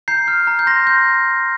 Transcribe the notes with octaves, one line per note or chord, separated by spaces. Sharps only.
A#5 G6 C7
F6
A#5
G6
C6 A#6
G6